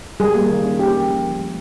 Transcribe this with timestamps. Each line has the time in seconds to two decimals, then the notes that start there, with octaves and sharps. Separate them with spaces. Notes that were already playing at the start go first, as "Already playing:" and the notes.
0.20 G3 G#4
0.35 A#3
0.50 D#3
0.64 C#4
0.79 A#3 G4
0.94 C#4
1.09 F3
1.25 F3
1.39 G#3